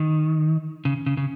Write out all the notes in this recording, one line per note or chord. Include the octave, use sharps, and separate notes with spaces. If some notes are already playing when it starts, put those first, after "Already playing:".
Already playing: D#3
C#3
C#3
C#3